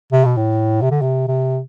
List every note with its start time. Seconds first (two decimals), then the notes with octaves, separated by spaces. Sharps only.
0.12 C3
0.25 B2
0.37 A2
0.82 C3
0.91 D3
1.02 C3
1.28 C3